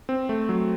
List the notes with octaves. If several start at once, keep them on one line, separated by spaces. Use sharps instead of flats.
C4
A3
F#3